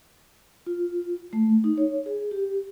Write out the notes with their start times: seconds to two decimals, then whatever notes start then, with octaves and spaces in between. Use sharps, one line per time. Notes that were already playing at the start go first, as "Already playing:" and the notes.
0.66 F4
1.33 A3
1.64 D#4
1.78 C#5
2.06 G#4
2.31 G4